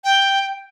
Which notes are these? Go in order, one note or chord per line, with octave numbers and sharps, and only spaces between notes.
G5